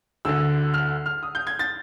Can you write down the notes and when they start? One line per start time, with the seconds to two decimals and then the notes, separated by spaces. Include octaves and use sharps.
0.25 D2 D3 E6
0.74 F6
1.06 F6
1.23 D#6
1.35 G6
1.47 G#6
1.59 A6